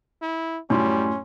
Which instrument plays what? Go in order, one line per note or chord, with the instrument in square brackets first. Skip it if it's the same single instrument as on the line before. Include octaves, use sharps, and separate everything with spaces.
[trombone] E4
[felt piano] F#2 A2 [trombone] G3 [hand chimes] A3 C6 [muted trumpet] C#4